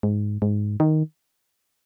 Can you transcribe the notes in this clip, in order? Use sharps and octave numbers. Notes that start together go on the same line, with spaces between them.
G#2
G#2
D#3